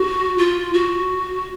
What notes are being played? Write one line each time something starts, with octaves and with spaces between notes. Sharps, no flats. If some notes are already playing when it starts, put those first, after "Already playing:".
Already playing: F#4
F4
F#4